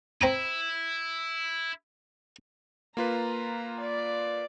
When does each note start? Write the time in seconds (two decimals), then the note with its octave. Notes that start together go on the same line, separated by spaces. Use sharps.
0.21 C4 E4 A#5 D#6
2.97 A#3 F4 B4 A#5
3.80 D5